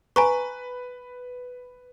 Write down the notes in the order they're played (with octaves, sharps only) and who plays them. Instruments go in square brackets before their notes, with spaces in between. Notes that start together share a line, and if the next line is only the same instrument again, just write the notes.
[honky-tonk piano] B4 [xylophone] G#5 A#5 C#6